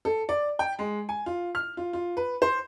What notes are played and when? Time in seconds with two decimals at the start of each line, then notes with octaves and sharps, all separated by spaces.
0.05 A4
0.29 D5
0.59 G5
0.79 G#3
1.09 G#5
1.26 F4
1.55 F6
1.77 F4
1.93 F4
2.17 B4
2.42 C5